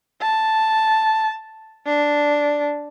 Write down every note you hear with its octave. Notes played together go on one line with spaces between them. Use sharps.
A5
D4